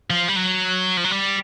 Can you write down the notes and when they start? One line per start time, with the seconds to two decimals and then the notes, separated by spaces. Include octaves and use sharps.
0.10 F3
0.28 G3
0.36 F#3
0.97 F3
1.04 F#3
1.11 G3